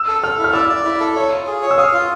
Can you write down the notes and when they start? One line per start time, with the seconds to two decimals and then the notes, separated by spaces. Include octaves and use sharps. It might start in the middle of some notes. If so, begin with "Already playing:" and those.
Already playing: E6
0.08 A4
0.23 A4 F6
0.38 E4
0.44 F6
0.53 D5 E6
0.69 D5
0.85 E4
1.00 A4
1.16 C#5
1.32 F4
1.47 G#4
1.62 C#5
1.71 E6
1.78 F5 D#6
1.93 F4